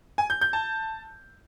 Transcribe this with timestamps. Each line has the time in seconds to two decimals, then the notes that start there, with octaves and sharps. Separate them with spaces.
0.18 G#5
0.30 G6
0.41 G6
0.53 A5